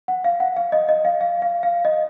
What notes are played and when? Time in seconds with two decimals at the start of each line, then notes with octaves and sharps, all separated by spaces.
0.08 F#5
0.24 F5
0.40 F#5
0.57 F5
0.72 D#5
0.89 D#5
1.05 F5
1.21 F5
1.42 F5
1.63 F5
1.85 D#5